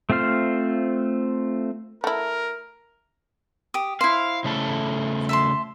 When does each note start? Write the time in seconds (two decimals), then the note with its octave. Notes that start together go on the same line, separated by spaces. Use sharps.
0.10 A3 C4 F4 C5 F6
2.04 A3 E4 A#4
3.74 G4 D#6
4.01 E4 C5 F5
4.44 C#3 A3 A4
5.29 E5 A5 C6